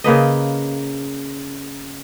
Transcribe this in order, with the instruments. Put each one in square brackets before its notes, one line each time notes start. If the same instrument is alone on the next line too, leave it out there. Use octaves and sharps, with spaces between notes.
[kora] C#3 A#3 B4 D#5